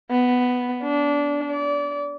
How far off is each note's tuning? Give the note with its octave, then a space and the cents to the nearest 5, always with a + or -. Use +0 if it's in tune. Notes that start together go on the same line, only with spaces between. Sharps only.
B3 +5
D4 -20
D5 -30